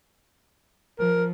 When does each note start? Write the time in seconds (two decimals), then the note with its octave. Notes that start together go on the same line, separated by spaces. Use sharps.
0.99 F3 A#4